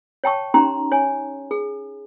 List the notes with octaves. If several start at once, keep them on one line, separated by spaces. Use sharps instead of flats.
C#5 G5 A5 C#6
C#4 D#4 G4 A#5 C6
C#5 G#5
G#4